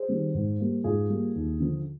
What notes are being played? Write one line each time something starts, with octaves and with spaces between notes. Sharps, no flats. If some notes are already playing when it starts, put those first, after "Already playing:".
Already playing: G#4 C5
D#3 G3 C4
G#2
G3 A#3
G#2 F4 G#4
G3 A#3
D#2
D3 F3